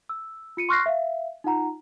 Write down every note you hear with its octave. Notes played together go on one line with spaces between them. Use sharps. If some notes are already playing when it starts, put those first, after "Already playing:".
E6
F4 C#7 D#7
C6 C#6 F6 F#6 A#6 C7
E5 F5
D#4 F4 F#5 A#5